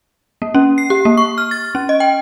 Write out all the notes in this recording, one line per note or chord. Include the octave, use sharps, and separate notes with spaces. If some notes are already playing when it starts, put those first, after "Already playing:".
A#3
C#4
C7
G4
A#3
C#6
F6
A6
C#4
D#5
G5